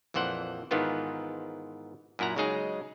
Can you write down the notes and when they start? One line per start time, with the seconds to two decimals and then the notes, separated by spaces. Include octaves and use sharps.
0.14 A#1 F2 E3 C5 F#5
0.71 G#2 D#3 E3 B3 F4
2.19 F#2 A#2 E4 F#5 A#5
2.36 C#3 F#3 G#3 D#4 G#4